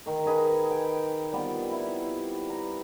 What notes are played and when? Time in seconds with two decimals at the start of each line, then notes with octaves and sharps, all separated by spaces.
0.06 D#3 A#4
0.26 D#4 G#4 B4
0.71 G5
1.32 G3 B3 C4 F4
1.71 E4
2.50 A#5